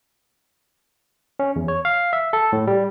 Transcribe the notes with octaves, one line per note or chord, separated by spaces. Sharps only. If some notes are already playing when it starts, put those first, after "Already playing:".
C#4
E2
C#5
F5
E5
A4
A2
G3